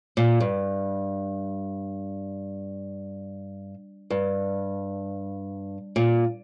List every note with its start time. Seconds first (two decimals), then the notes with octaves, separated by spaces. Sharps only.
0.17 A#2
0.40 G2
4.10 G2
5.96 A#2